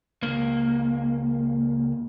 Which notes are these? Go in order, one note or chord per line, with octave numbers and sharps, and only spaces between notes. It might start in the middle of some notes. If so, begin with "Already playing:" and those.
C#2 A#3